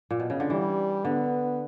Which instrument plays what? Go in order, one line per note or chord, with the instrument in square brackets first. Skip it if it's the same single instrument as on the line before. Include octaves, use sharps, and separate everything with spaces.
[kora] A#2
B2
C#3
D3
[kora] E3 [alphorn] G3
[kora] D3 [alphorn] B3